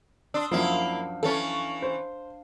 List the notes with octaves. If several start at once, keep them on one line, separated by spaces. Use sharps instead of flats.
D4 C6 D#6 E6
F#2 F3 A#3 D4 E4 E5 F5 C6
E3 C#4 A4 A6 C#7
C5